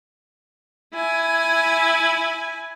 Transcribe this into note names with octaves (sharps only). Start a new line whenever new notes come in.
E4 G#5